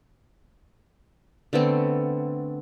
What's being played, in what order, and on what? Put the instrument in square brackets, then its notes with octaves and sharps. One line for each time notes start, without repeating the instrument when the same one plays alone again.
[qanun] D3 A3 B3 C4